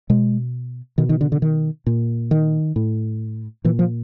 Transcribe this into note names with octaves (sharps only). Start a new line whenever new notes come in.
B2 G#3
B2 D#3
D#3
D3
D3
D#3
A#2
D#3
A2
A#2 E3
F3